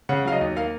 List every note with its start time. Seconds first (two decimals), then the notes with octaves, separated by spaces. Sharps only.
0.09 C#3 F#5
0.25 F#3 F5
0.32 D#5
0.41 D#2
0.56 A#3 F5